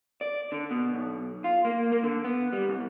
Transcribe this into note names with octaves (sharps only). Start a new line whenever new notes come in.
D5
D3
B2
B1
F4
A#3
A#3
D3
B3
G3
C2